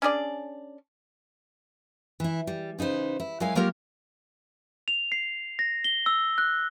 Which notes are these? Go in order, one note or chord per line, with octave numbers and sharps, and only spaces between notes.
C#4 D4 G#4 D5
E3 E4
G3
C#3 D#4 B4 C5
E4
F#3 G#3 E4 A#4 F5 G#5
F#3 A#3 F4 G4 A#4 C#5
F7
C7
A#6
G7
E6
F#6